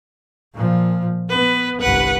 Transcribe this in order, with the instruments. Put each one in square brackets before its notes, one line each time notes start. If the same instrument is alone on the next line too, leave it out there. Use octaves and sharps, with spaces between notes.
[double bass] A#2 F3
[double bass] B3 [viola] B4
[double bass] G1 C2 [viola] B4 F#5